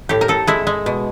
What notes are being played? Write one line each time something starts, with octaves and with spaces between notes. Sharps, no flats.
A2 G4
A#4
A2 A4
G#3 E4
G#3
B2